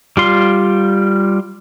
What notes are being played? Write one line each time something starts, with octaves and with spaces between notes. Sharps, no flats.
G3 F4 C6